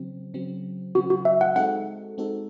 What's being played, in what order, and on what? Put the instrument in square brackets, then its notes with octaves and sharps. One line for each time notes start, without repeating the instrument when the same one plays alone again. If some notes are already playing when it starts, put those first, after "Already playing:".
Already playing: [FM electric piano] C#3 F#3 C4
C#3 F#3 C4
[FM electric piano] C#3 F#3 C4 [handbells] F#4
[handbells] F#4
E5
F#5
[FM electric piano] G#3 C4 D#4 F#4 A4 [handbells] F#5
[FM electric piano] G#3 C4 D#4 F#4 A4